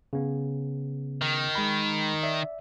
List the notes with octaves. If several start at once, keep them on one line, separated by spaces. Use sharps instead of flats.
C#3 B3
D#3
G#3 B5
D5 E5